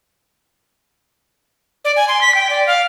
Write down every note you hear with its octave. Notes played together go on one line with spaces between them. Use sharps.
D5
G#5
C6
B6
G5
D5
F5